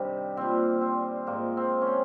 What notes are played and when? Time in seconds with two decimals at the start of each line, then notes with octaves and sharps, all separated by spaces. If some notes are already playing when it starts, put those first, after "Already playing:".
Already playing: G2 C3 D#3 G3
0.37 A#2 G3 C4
0.81 C4
1.27 G#2 F3 A#3
1.57 C4
1.82 C#4
1.87 C4